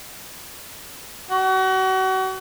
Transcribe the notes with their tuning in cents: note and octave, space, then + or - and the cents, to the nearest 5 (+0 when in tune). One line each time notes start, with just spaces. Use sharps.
F#4 +35